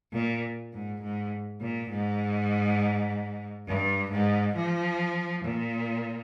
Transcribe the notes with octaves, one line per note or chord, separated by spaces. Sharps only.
A#2
G#2
G#2
A#2
G#2
G2
G#2
F3
A#2